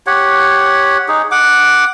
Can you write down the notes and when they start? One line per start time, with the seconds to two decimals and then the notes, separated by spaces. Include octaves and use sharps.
0.07 G4 C#5 F#5
1.08 D#4 G#4
1.31 F#5 D6